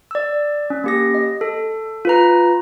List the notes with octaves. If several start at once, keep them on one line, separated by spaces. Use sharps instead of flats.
D5 E6
C#4
A#3 G4 A#6
D#5
A4
F4 B4 A#5